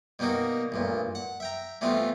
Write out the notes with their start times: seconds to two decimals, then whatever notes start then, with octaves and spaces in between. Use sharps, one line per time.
0.19 B2 G3 A#3 D#4 F#4
0.72 A1 G2 A#2
1.15 F#5
1.40 E5 G5 A#5
1.81 E3 G3 A3 B3 C4 F4